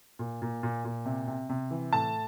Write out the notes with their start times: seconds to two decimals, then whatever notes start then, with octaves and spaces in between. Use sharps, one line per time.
0.19 A#2
0.42 A#2
0.63 A#2
0.85 A#2
1.06 C3
1.27 C3
1.50 C3
1.71 E3
1.93 A2 A5